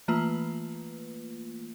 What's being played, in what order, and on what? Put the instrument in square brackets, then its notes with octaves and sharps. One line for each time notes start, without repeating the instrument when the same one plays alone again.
[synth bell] E3 A3 A#3 F4 B4